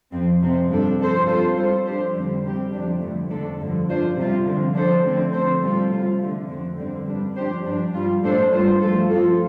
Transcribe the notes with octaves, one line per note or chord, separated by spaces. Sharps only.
F2 F3 C4
C3 F3 C4
G2 F3 D4 A4
F3 C4 A4 C5
G3 F4 A4 C5
G3 F4 A4 C5
F3 D4 G4 C5
F2 D3 G3 C4
C3 G3 C4 G4
F2 C3 F3 D4
G2 D3 F3 A3
F2 D3 A3 D4 A4
G2 D3 F3
F3 D4 F4 C5
C3 G3 C4 F4
D3 F3 C4
F3 D4 A4 C5
D3 A3 C4
F3 C4 A4 C5
A2 G3 C4 F4 A4
C3 G3 F4
D3 F3 A3
F2 D3 A3 C4
G2 D3 G3 C4
G2 G3 D4
F3 D4 G4 C5
G2 F3 D4
G2 G3 F4
A2 A3 D4 A4 C5
G2 G3 F4 C5
F3 A3 F4 A4
F3 C4 F4 A4